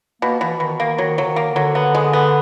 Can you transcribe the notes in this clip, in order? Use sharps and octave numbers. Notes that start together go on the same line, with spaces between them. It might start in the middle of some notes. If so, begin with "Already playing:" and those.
B2 A#3
B2 E3
B2 D#3
D#3 A#3
D#3 F#3
D3 F#3
D#3
A#3
D3
F#3
B3
G#3
B3